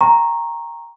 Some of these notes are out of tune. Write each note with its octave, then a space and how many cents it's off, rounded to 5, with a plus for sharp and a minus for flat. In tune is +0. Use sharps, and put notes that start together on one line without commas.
G5 +15 A#5 +0 C#6 -30